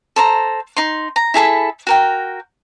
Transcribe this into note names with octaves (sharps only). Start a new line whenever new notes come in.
A4 C5 A#5
D#4 C6
A#5
E4 G#4 A4 B5
F#4 A#4 G5